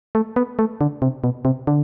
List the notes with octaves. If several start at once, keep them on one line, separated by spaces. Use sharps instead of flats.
A3
B3
A3
D3
C3
B2
C3
D3